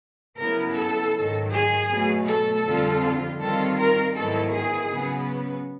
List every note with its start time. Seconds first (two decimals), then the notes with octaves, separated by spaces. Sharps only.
0.38 C#3 F#3 B3 E4 A#4
0.76 A4
1.14 G#2 D#3 F#3
1.52 G#4
1.89 B2 F#3 A3
2.27 A4
2.65 F2 D3 G3 C4 F4
3.39 D#3 G3 C4 F4 A4
3.78 A#4
4.15 G#2 D#3 F#3 B3 E4 A4
4.53 G#4
4.91 C#3 F#3 B3